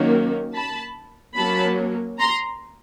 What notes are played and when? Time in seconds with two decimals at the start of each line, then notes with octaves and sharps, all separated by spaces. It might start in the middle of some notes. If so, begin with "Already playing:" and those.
Already playing: D#3 F#3 A#3 C#4
0.55 A5 B5
1.37 F#3 A#3 C#4 A5 B5
2.19 A#5 C6